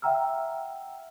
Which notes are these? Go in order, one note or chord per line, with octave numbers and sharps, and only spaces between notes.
E5 F#5 G5 A#5 E6 F6